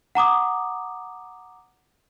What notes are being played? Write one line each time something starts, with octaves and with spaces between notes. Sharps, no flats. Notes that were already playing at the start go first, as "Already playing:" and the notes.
F#5 A#5 D6 D#6